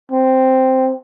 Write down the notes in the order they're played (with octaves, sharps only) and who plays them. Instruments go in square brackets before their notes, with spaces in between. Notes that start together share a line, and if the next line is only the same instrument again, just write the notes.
[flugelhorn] C4